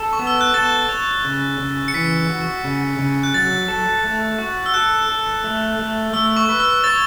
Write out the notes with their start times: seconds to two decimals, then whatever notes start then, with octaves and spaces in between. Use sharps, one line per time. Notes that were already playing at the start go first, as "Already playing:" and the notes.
Already playing: A4
0.13 C#6
0.19 B3
0.27 E6
0.41 F#6
0.54 A4 A6
0.89 C#5
1.24 C#3
1.60 C#3
1.88 C#7
1.94 E3 B6
2.30 F#4
2.64 C#3
2.99 C#3
3.23 F#6
3.34 F#3 A6
3.68 A4
4.04 A3
4.38 F#4
4.66 E6
4.74 A4 F#6
5.09 A4
5.44 A3
5.79 A3
6.13 A3 E6
6.37 C#6
6.49 B4
6.60 E6
6.84 C#5 A6